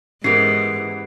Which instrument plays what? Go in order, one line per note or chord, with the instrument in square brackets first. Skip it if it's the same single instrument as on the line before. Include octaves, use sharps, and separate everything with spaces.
[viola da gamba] G#2 [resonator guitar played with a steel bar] E3 B3 [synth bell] C#4 G4 A#4 [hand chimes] C7 D7